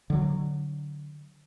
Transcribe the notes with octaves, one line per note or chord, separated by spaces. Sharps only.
D3 F#3